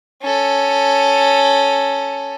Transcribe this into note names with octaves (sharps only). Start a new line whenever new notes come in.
C#4 A4